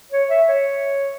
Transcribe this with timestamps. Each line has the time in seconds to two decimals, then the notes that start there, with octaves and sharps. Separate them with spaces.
0.12 C#5
0.30 E5
0.48 C#5